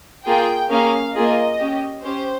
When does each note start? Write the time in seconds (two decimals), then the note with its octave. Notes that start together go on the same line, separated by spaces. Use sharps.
0.26 A#3 F4 G#4 G5
0.71 A#3 C#4 G#4 F5
1.15 A#3 F4 G#4 D#5
1.59 C#4 G4
2.04 C#4 G4 C5